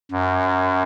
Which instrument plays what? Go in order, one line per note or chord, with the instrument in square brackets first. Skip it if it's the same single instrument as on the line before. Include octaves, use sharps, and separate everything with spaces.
[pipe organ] F#2